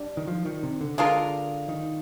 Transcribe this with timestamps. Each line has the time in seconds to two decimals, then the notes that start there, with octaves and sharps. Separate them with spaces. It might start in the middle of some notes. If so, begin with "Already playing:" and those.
Already playing: G3 D4
0.17 D#3
0.27 F3
0.45 D#3
0.63 C3
0.81 D3
0.98 G#3 D4 F4 A#4
1.68 D#3